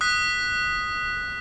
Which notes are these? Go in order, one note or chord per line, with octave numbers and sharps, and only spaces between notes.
D#6 F#6 B6